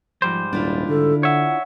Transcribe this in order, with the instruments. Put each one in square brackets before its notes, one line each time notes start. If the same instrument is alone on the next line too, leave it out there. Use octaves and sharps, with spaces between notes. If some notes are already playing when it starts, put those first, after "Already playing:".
[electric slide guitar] G#2 G3 C5 [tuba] F3
[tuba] D#1 [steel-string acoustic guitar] D4 E4 F4
[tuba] D3 [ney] A4
[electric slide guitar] C#5 E5 [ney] F#5